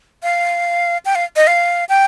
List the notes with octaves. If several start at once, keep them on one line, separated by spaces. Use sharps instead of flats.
F5
G5
F5
D#5
F5
G5